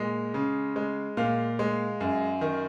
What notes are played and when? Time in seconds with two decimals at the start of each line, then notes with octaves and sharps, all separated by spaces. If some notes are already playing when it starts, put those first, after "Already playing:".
Already playing: A#2 G#3
0.34 C#3
0.76 G#3
1.17 A#2 F5
1.59 G#3
2.01 F#2
2.41 D#3